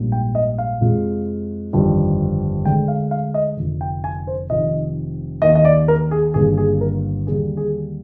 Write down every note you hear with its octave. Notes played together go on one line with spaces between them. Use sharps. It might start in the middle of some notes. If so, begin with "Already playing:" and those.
Already playing: A#1 G#2 G3 A#3
G5
D#5
F5
F2 C3 F3 G#3
G1 F2 D#3 G3
D2 D3 G#3 G5
F5
F5
D#5
F1 F2 D3
G5
G#5
C5
F1 F2 D#3 D#5
D#2 D#3 A#3 D#5
D#5
D5
A#4
G#4
G1 G2 D#3 A#3 G#4
G#4
A#4
D#2 D3 G3 A#3 G#4
G#4